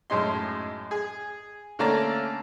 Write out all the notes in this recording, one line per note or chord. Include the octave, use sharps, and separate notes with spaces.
F#2 A2 G#3 D#4 C6
G#4
D3 A3 A#3 C#4 D5 A#5